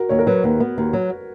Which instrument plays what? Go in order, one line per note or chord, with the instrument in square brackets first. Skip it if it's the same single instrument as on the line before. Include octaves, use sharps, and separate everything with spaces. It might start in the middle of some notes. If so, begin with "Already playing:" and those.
Already playing: [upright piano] F#4 A#4
[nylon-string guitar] D#2 [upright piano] C#5
[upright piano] A#4
[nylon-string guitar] F#3 [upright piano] B4
[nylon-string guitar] D#2
B3
D#2
F#3